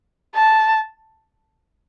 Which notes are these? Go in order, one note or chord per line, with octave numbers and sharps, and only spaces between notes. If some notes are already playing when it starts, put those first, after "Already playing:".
A5